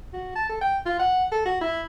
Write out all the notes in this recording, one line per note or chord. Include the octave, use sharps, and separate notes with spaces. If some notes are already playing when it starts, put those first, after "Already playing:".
F#4
A5
A4
G5
F4
F#5
A4
F#4
E4